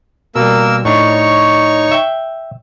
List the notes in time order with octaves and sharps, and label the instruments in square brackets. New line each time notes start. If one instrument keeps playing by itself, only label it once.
[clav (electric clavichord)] B2 G3 [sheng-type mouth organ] A#3 A#4 E6
[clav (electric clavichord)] A2 D4 [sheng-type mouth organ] D#4 C#5 C#6
[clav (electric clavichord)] E5 G5